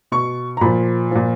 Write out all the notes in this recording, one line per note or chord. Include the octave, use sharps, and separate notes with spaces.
B2 C#6
A#5
A#2 F3 B5
A#2 F3